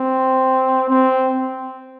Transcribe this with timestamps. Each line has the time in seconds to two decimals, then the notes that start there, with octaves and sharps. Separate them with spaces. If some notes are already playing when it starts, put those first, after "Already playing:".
Already playing: C4
0.90 C4